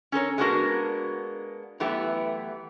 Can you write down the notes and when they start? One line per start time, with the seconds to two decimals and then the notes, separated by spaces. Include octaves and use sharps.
0.12 C#4 A4 A#4 C#5
0.38 G#3 A#3 B3 D4 F#4 A#4
1.80 F#2 E3 A3 B3 G4